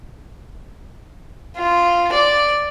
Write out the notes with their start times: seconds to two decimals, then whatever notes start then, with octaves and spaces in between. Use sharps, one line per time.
1.58 F4
2.13 D5